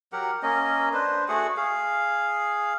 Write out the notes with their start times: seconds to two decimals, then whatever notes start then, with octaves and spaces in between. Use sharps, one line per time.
0.13 F#3 G4 A#4 F#5
0.43 A#3 C#4 D#5
0.93 D4 B4 C5
1.28 A3 F#4 G#4 F#5
1.57 G#4 F5